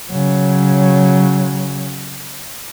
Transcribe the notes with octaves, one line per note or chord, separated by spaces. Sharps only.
C#3 F#3